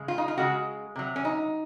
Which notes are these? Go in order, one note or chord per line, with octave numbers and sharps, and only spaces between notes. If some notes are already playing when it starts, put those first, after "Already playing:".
Already playing: C#3 G#3
F4
D#4
F4
C#3 G#3 F#4
C3 F#3
C#4
D#4